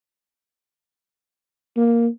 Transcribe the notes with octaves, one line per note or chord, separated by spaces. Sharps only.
A#3